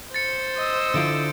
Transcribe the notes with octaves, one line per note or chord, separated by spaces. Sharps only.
C5 A6 C#7
D#5 E6
D3 E4 F4 G6 D7